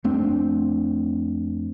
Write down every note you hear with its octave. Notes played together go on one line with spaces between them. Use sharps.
F2 A3 C4 D4